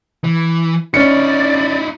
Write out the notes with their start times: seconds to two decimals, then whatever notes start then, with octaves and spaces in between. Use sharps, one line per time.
0.24 E3
0.94 C#4 D#4 E4 D5 C#7